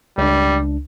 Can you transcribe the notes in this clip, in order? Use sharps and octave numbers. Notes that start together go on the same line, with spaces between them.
C#2 G3 D4